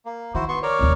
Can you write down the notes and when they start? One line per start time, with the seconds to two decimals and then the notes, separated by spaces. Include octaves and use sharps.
0.06 A#3
0.35 D#3 E4 F#4 C5
0.49 B3 C6 C#6
0.63 A#4 C#5 D5
0.79 F1 D#2